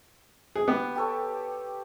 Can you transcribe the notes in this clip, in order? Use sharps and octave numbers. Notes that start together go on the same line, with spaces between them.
G#4
B3 G4 B4
G4 A4 C#5